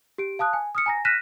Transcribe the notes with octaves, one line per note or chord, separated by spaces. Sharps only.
G4 D7
F5 A5 D#6 F#6
G#5
D#6 F6 C#7
G#5 A#5 A#6
F6 F#6 A#6 B6 D#7 E7